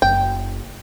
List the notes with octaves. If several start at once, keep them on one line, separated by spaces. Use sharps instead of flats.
F#1 G5